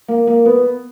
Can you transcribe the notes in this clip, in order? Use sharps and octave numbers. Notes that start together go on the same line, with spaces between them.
A#3
A#3
B3